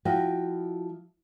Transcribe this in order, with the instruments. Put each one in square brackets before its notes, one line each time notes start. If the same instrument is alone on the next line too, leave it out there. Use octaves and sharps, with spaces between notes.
[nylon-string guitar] F3 E4 F#4 D#5 G5